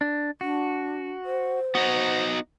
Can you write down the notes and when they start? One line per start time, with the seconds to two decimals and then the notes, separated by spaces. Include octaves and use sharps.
0.01 D4
0.41 D4 F#4
1.25 C5
1.75 B3 D#4 F#4